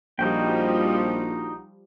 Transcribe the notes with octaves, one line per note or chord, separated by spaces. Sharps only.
A#1 F3 G3 D#4 F#4 G5